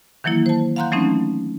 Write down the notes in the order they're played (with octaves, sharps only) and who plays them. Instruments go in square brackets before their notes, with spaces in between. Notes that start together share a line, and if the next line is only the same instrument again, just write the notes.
[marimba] D#3 E3 F#3 A#3 E4
C5 A5
F5 F#5 A#5 C6 F#6 G6
E3 F#3 A3 C4 C#4 D#4